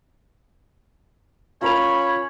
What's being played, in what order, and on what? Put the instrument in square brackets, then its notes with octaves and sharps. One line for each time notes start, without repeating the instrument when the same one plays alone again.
[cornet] C#4 [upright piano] F4 A#4 F7 [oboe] C#5 [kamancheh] B5